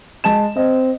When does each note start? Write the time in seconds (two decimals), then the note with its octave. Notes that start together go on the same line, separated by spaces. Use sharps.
0.24 G#3 A5 E7
0.57 C4 D#5